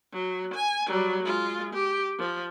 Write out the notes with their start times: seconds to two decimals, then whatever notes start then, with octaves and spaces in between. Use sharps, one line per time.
0.13 F#3
0.54 G#5
0.87 F#3 G3
1.23 G#3 F4
1.73 G4
2.19 F3